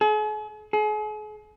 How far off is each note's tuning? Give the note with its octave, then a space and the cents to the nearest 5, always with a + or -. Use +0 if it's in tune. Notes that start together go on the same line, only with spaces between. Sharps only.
G#4 +45
G#4 +40